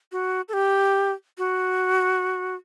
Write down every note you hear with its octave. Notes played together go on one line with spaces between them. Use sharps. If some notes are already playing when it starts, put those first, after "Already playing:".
F#4
A4
G4
F#4